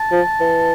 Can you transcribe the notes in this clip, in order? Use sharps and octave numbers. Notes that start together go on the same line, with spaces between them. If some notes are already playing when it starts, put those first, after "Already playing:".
Already playing: A5
F3
E3